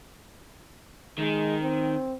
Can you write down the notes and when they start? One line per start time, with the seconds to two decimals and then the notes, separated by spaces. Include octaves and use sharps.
1.18 D#3 G#3
1.63 C4